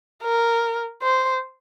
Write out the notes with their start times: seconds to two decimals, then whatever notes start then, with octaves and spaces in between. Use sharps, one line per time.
0.23 A#4
1.02 C5